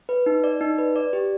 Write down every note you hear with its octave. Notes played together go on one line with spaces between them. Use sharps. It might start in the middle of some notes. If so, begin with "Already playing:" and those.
B4
D#4
D5
D#4
B4
D5
G4